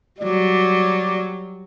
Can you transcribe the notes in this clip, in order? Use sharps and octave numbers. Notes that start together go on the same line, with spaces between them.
F#3 G3 D5